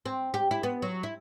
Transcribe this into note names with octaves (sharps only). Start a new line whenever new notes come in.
C4
G4
E4
B3
F#3
E4